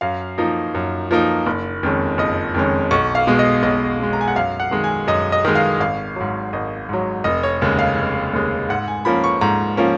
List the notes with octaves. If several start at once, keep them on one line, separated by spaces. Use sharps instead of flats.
F#2 F5
F3 A#3 D#4
F#2
F3 A#3 D#4
F#1
F2 D#3 G#3 C#4
F#1 D#5
F2 D#3 G#3 C#4
B1 C#6
F5
B2 G#3
D#5
B1 D#5
B2 G#3
A#5
G#5
F#5
F#2 F5
F#5
D#3 G#3
G#5
F#2 D#5
D#5
D#3 G#3
F5
G#1 F5
G#2 F#3
G#1 D#5
G#2 F#3
F1 D#5
C#5
D#2 C#3 G#3
F5
F1
D#2 C#3 G#3
G#2 F#5
G#5
F3 A#3 C#4 B5
C#6
G#2 A#5
F3 A#3 C#4